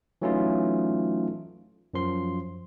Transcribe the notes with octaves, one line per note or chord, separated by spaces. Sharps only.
E3 F#3 A3 C#4 D#4 F4
F#2 F3 C6